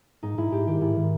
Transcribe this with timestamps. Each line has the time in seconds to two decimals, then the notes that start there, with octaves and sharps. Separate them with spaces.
0.23 G#2 D#4
0.37 G#2 E4
0.52 G#2 G4
0.67 D#3 G4
0.81 G#2 E4
0.96 D#3